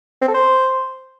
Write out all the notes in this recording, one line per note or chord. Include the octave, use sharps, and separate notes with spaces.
C4
A4
C5